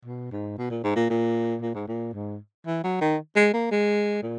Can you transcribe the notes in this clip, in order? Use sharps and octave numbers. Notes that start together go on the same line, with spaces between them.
B2
G#2
B2
A#2
G#2
A#2
A#2
A#2
G#2
A#2
G#2
E3
F#3
D#3
G#3
A#3
G#3
A#2